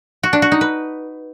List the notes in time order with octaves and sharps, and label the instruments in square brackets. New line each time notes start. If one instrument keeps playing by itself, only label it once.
[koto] F#4
D4
F#4
D#4
B4